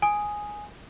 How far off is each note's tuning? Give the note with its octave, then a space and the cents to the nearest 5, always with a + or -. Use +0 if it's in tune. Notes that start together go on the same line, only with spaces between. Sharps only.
G#5 +0 D#6 +0